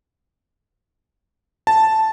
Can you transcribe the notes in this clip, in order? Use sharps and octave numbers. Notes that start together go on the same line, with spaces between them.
A5